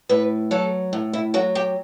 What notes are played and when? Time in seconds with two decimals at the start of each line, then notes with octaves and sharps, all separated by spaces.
0.09 A2 B4
0.51 F#3 A4
0.93 A2
1.13 E4
1.34 F#3 F#4
1.55 G4